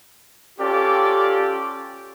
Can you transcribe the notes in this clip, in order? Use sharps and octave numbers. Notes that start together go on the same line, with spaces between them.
C#4 F4 G4 A4 D5 G5